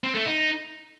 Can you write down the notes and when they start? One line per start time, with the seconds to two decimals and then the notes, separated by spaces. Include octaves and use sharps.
0.04 C4
0.15 A3
0.26 D#4